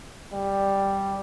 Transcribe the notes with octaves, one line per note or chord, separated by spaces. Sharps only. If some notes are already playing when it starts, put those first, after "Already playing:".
G3